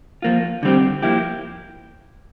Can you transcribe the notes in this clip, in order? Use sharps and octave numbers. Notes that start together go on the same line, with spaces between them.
F3 A#3 F4
D3 G3 C4 G4
F3 A#3 E4 G4